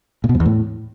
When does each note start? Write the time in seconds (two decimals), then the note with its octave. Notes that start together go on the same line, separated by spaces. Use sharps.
0.24 A#2
0.29 B2
0.35 F2
0.40 E2
0.45 A2